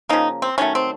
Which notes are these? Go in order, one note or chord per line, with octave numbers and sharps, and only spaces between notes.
C#3 F3 A#3 D#4
C4
D#3 F#3 A3 C#4
C4